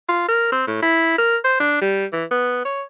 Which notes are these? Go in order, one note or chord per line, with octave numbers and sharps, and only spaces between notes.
F4
A#4
C4
A2
E4
A#4
C5
D4
G3
E3
B3
C#5